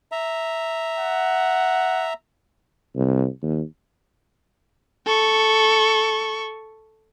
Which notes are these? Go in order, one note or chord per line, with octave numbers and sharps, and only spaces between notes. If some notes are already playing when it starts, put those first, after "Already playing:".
E5 A#5
F#5
C2
D#2
A4 C#6